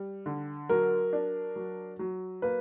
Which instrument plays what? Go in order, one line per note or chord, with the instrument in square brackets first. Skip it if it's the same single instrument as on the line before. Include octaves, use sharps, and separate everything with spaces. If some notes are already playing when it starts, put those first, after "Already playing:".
Already playing: [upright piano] G3
D3
[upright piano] F#3 [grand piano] A#4
[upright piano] D4
F#3
F#3
[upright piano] A#3 [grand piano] B4